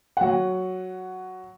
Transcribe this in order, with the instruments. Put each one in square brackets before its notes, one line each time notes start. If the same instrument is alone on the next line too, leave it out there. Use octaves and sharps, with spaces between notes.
[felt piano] F#3 F#5